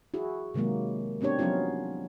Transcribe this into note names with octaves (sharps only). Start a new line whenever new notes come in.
E4 F#4 G#4
C3 D#3 F#3 G#3 A#3
B3 C4 D4 G4 C#5
F3 F#3 B3 C#4 D#4 F4